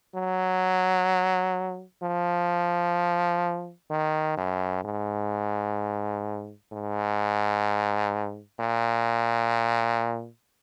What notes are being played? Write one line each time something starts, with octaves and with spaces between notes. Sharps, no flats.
F#3
F3
D#3
F#2
G#2
G#2
A#2